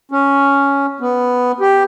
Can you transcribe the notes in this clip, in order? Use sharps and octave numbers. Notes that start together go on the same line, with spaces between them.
C#4
B3
G4